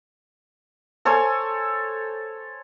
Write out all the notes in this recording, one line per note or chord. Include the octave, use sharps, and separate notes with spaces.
A4 C5 C#5 G#5